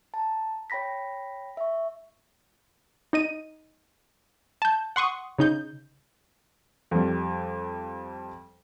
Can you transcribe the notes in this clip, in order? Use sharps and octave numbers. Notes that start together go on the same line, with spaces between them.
A5 A#5
C#5 G5 B5 A#6 B6
E5 C#6
D#4 D#5 D#7
A5 G6
F#5 C6 C#6 D#6
C#3 D#4 G6
F2 G3